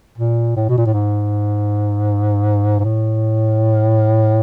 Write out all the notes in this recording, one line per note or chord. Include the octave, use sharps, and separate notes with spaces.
A#2
A2
B2
A#2
A2
G#2
G#2
A2